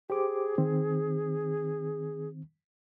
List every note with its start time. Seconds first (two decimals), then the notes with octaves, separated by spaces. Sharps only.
0.10 G4 G#4 C5 D6
0.58 D#3 C4